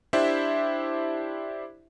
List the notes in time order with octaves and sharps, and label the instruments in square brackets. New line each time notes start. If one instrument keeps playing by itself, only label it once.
[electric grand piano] D4 E4 G4 C5 E5